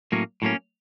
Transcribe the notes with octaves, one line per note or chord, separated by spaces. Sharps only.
A2 F#3 A#3 C#4
A2 F#3 A#3 C#4